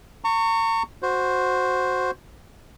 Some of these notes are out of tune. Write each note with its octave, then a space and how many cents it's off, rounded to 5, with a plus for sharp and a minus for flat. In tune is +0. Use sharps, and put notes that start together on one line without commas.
A#5 -40 C#6 +0
F#4 -10 C5 +0